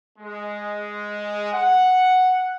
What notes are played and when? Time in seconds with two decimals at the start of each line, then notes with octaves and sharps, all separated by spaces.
0.19 G#3
1.54 F#5